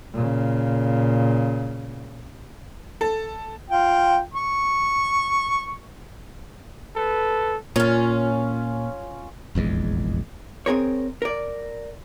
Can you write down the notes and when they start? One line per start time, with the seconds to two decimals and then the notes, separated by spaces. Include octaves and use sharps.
0.13 A#2 C#3
3.01 A4
3.70 F4 G5
4.34 C#6
6.97 A4 B4
7.76 A#2 C#4 F4
9.55 F1 A#1 E2 G#3
10.66 C4 G#4 A#4 C#5
11.22 A#4 D5